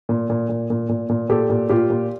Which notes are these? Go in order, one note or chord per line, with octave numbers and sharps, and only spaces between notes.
A#2
A#2
A#2
A#2
A#2
A#2
A#2 G4 A4
A#2
A#2 F4 G4
A#2